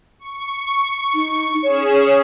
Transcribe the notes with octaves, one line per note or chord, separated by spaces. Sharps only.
C#6
D#4
C#4 G#4 C#5 E7